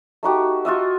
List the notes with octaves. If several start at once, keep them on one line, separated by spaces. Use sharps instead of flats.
A3 D#4 F#4 G4
F4 F#4 D#5 E5